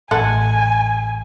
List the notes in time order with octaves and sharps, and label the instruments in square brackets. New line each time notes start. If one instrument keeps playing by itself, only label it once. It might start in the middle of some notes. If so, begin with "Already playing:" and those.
[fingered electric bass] A1 [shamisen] A4 F#5 [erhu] G#5